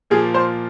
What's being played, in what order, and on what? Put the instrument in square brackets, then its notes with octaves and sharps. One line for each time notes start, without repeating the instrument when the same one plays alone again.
[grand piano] A#2 F3 A#3 F4 [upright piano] G#4
[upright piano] C5